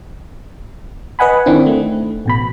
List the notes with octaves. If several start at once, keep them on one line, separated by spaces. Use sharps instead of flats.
B4 D#5 F#5 G#5 B5
D#3 C4 D4 E4
A3
A1 B2 B5